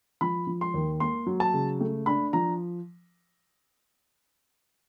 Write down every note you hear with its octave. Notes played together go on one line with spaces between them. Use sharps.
F3 B5
F3
C6
D#2
A#3 C6
F#3
A5
C#3
A3
D4 B5
F3 A#5